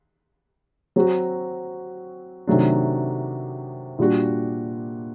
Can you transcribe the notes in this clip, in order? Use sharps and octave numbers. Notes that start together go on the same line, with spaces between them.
F#3 C4 F#4
C3 D#3 F#3 A3 D4
A#2 G3 D4 F#4